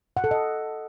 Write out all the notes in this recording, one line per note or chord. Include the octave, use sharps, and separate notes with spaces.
F#5
A4
D#5